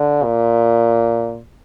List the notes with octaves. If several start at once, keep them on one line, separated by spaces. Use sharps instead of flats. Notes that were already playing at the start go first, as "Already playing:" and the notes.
Already playing: D3
A#2